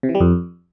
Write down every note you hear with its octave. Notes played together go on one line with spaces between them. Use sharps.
C3
E3
G3
F2